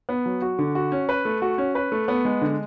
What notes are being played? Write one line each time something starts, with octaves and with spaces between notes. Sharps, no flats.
B3
F#3
F#4
D3
F#4
C#4
B4
A3
F#4
C#4
B4
A3
B3
G#3
D3